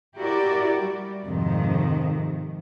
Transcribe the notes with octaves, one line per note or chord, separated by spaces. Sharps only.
E4 F#4 G4 A#4 D5
G3
F2 G#2 C3 D#3